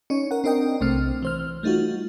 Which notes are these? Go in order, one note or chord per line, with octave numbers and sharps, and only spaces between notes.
C#4 D#4 C#5
A#4 F#5
C4 D4 A#4 D#5 G5
B1 C3 A3 C4 F6
E3 C5 F6
G3 A3 D#4 F4 F#4